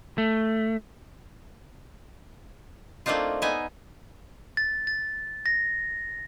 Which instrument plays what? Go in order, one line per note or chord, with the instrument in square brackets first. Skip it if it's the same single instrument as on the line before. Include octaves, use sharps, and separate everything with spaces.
[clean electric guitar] A3
[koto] A3 A#3 C4 D4 D#4 F4
B3 D#4 E5 G#5
[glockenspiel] A6
A6
A#6